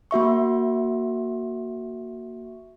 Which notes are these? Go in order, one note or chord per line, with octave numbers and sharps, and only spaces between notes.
A#3 F#4 E5 C#6